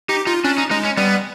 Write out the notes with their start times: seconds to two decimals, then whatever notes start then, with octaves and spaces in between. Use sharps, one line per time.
0.09 D#4 G4
0.26 D#4 F4
0.44 C#4 D4
0.58 D#4
0.71 G#3 D#4
0.84 C#4
0.97 G3 B3